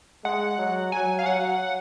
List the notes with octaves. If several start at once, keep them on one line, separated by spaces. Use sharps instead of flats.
G#3 F#5
F#3
F#3 G#5
F5
F#3 F#5